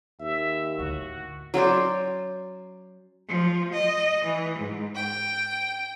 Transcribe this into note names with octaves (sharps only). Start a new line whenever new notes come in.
D#2 E5
D2 A2 F#4
F#3 C#4 C5 D5
F3
D#5
E3
G#2
G5